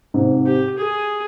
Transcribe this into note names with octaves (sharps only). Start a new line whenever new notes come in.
G#2 C3
G4
G#4